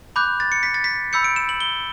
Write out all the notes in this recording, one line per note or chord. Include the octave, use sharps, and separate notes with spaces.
B5 D6 F#6 G6
A6
C#7
B6
A6
B6
B5 E6 G6 C#7
D7
E7
F#7
G7